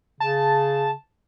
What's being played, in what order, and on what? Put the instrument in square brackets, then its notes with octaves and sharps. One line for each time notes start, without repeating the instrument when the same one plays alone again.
[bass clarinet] C#3 [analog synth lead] A5